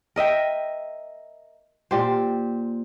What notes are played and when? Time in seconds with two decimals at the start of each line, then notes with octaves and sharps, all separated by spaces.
0.16 A#4 D#5 E5 G5
1.91 A#2 G4 C5